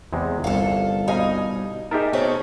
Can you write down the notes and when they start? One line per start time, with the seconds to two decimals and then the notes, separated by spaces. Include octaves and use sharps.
0.13 E2 C3 G#3
0.44 G1 C2 F4 A4
1.08 B2 G3 D#4 C5 D#5 F5 G#5
1.91 D#4 G4 G#4 A#4 D#5 E5 A5
2.13 B2 A3 C4 C#4